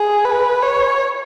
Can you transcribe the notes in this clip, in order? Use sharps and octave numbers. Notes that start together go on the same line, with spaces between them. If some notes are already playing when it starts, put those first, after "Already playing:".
Already playing: G#4
B4
C#5